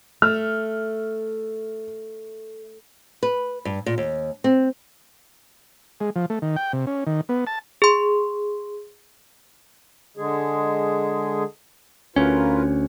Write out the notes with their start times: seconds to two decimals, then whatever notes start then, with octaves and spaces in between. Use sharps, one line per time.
0.22 A3 F6
3.23 B4
3.65 G2
3.86 A#2
3.98 D#2
4.44 C4
6.00 G#3
6.16 F3
6.30 A3
6.42 D#3
6.56 G5
6.73 C3
6.87 C#4
7.07 D#3
7.29 B3
7.47 A5
7.82 G#4 C6
10.17 D3 G#3 G#4
12.16 D2 C#4 F4 A#4 B4